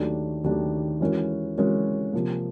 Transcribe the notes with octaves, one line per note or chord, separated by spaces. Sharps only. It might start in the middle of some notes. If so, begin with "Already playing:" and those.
Already playing: D#2 D#3 F#3 A3 D4
D#2 D#3 F#3 A3 D4
E3 G#3 C#4 F#4 A#4
E3 G#3 C#4 F#4 A#4
C3 F3 A#3